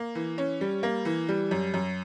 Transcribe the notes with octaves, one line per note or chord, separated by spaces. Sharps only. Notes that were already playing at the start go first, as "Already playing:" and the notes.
Already playing: A#3
E3
C#4
G3
A#3
E3
G3
F#2
F#2